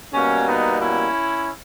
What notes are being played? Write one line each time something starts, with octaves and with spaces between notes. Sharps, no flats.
B2 G3 A#3 C#4
B3 D#4
C#4 E4